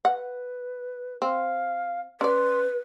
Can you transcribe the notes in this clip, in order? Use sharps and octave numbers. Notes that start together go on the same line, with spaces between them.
B4 F#5
C4 F5
C#4 B4 D5 C6